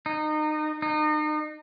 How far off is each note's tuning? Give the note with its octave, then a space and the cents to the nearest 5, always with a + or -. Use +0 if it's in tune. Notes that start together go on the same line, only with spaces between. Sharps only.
D#4 -25
D#4 -35